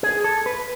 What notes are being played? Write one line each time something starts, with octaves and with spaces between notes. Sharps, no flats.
G#4
A4
B4